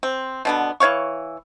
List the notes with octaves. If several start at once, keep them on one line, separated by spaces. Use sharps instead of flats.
C4
B2 D3 B3
E3 C#5 F5 C#6